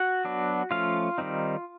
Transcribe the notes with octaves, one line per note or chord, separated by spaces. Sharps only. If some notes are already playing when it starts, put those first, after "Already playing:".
Already playing: F#4 F#5
F#3 B3 D4
F3 A3 C#4 F4 F5
D#3 G3 C4 D#4